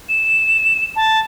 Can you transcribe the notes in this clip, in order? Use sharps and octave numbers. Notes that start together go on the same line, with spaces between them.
E7
A5